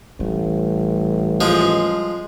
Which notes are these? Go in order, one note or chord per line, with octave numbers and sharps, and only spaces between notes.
A1 G3
F3 G#3